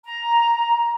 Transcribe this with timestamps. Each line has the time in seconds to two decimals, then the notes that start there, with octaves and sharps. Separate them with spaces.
0.05 A#5